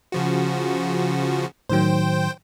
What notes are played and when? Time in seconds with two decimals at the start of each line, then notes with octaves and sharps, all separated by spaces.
0.12 C#3 F3 F#4
1.69 A2 D#3 F#3 C5 G5